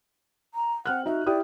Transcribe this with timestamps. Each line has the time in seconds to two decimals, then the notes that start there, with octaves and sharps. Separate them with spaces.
0.54 A#5
0.86 C4 F#5 F6 F#6
1.06 D#4 F#4 E5
1.27 E4 G4 D5 D#6